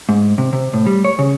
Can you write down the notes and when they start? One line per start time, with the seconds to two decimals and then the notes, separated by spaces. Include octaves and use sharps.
0.09 G#2
0.38 C3
0.53 C3
0.74 A2
0.86 G3
1.05 C#5
1.19 C#3